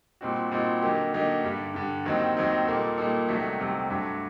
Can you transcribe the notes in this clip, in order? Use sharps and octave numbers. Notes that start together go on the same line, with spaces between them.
A#2 G3 C4 D#4 F#4
A#2 G3 C4 D#4 F#4
D3 F#3 A#3 D#4 G4
D3 F#3 A#3 D#4 G4
G2 D3 G3
G2 D3 G3
D#2 D#3 F#3 C4 D#4
D#2 D#3 F#3 C4 D#4
A#2 G3 A#3 D#4 A4
A#2 G3 A#3 D#4 A4
C2 C3 D#3 F#3 A3
C2 C3 D#3 F#3 A3
G2 F#3 A3 D4